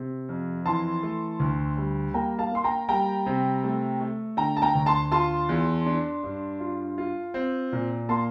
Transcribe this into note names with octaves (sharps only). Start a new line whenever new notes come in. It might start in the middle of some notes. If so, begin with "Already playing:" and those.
Already playing: C3
F2
E3 A5 C6
A3
D2
G3
A#3 G5 A#5
F5 A5
A#3 C6
G5 A#5
G3 G5 A#5
C3
A3
A3
D3 G5 A#5
A5
G5 A#5
D2
A5 C6
F4 A5 C6
E2
D4
G2
F4
F4
C4
A#2
A#3 A5 C6